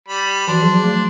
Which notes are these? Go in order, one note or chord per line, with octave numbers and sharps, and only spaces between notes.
G3 B5
E3 F3 D4 F#4 C5
F#3 G#4
A3 D6